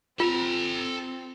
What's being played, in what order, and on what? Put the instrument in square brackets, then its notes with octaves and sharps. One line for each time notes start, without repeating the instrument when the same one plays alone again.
[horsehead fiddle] C4 [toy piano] F4 [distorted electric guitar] A4 A#5